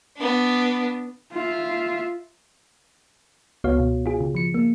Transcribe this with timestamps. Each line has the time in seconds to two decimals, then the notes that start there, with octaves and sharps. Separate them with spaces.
0.17 B3 D4
1.32 F4 E5
3.64 C#2 B3 F#4 C#5 F5
3.80 B2
4.06 F4 G#4
4.21 C#3
4.35 F3 C#7
4.54 A#3